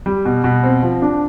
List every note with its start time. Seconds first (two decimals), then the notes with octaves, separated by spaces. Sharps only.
0.06 G3
0.25 B2
0.44 B2
0.63 C4
0.82 F3
1.02 D4